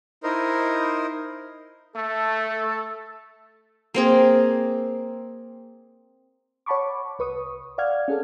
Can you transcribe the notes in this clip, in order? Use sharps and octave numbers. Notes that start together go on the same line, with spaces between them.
D#4 E4 A#4 C5 D#5
A3 A4
A#3 C4 G#4
C#5 F#5 A5 B5 C#6 D6
C2 B4 C#6 D#6
D5 F5 F#5 F6 G#6
C#4 G#4 A4